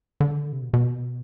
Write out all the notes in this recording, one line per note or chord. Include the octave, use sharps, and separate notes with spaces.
D3
C3
B2
B2